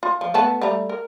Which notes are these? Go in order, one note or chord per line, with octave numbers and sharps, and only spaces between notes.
F4
F3
A3 B3 A5
G3 A3 A#5
A#4